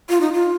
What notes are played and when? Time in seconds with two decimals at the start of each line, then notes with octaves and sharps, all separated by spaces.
0.09 F4
0.21 D#4
0.33 F4